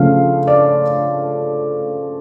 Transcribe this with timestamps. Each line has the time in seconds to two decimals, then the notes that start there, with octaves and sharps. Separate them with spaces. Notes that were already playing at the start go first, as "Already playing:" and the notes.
Already playing: C#3 F3 A3 C#4 F5
0.47 D5